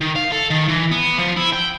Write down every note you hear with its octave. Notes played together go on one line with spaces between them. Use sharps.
D#3
F5
A4
D#3
E3
B3
F3
E4
G5